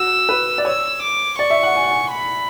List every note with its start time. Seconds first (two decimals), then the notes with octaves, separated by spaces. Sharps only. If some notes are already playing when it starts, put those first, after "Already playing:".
Already playing: F#4 E6
0.29 B4
0.58 D5
0.65 C#5 E6
1.03 D6
1.39 D5 C#6
1.50 E5
1.63 F#5
1.76 G#5
1.83 F#5
1.91 G#5
2.12 B5